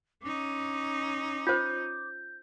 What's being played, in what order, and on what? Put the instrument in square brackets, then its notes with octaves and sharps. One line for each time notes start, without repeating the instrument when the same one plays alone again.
[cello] C#4 D#4 [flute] D6
[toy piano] F4 C5 [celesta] G6